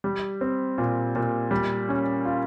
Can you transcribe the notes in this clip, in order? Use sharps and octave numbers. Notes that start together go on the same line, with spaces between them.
G3
C4
A#2
A#2
G3
C#4
F4